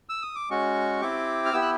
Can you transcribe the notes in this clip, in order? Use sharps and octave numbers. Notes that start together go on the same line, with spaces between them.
E6
D#6
D6
G#3 C#4 F#4 C#6
C4 E4 G4 D6
F6
B3 E4 G4 E6
F#6